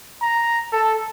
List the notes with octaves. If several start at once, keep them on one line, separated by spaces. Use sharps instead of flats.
A#5
A4